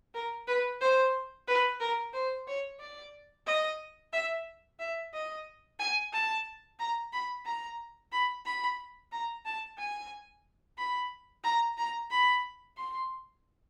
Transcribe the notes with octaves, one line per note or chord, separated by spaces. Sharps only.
A#4
B4
C5
B4
A#4
C5
C#5
D5
D#5
E5
E5
D#5
G#5
A5
A#5
B5
A#5
B5
B5
A#5
A5
G#5
B5
A#5
A#5
B5
C6